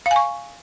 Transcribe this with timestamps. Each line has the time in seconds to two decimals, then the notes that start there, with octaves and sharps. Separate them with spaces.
0.06 F5
0.11 G#5
0.16 C#6